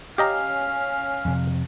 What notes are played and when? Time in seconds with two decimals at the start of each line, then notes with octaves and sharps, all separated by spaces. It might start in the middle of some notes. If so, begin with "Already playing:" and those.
0.18 C#4 G4 D#5 F5 A#5
1.25 F2 C3